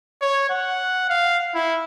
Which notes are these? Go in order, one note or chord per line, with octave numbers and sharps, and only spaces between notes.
C#5
F#5
F5
E4